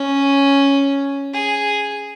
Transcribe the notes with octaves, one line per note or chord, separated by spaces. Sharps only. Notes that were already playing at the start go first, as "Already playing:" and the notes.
Already playing: C#4
G#4